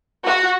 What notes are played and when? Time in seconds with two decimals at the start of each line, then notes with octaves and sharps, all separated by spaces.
0.25 F#4